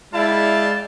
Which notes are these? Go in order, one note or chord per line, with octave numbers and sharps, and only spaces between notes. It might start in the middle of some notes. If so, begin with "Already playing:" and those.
G#3 E4 D5 F5 G5 A5